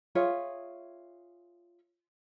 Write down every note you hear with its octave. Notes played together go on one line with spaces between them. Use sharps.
F4 G#4 C#5 E5